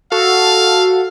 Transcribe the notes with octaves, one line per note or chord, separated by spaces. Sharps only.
F#4 A4 F5